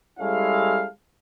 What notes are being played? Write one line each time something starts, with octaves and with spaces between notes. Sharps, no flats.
G3 G#3 C#4 E4 A4 F5